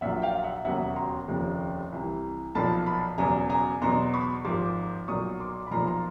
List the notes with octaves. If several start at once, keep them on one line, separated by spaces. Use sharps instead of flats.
A#1 A#2 F#3 E5 F#5
F5 G5
E5 F#5
E1 D#2 C#3 F#3 E5 F#5
A#5 C6
F1 D#2 C#3 F3
C2 C3 E3
B1 A#2 F3 A5 B5
A5 B5
E1 E2 C#3 F#3 G#5 A#5
G#5 A#5
E2 B2 F#3 A#5 C6
B5 C#6
G#1 G#2 F3 C6 D6
C6 D6
B1 A#2 F#3 C#6 D#6
C6 D6
B5
B1 A#2 F3 A#5 C6
A#5 C6